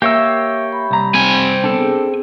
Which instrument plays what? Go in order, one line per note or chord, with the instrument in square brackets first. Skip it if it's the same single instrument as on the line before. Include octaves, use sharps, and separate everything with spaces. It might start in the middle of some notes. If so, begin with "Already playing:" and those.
[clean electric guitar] A#3 [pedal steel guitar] G4 C#5 E6 [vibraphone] E5
[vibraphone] B5
[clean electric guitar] C2 A#5
[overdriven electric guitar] C4 G#5
[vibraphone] B3 [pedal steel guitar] D4 A4
[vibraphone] G#4